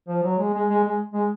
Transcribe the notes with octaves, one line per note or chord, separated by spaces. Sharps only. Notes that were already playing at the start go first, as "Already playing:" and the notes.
F3
F#3
G#3
G#3
G#3
G#3
G#3